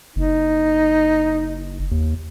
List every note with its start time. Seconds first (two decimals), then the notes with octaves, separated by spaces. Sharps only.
0.16 F#1 D#4
1.91 D#2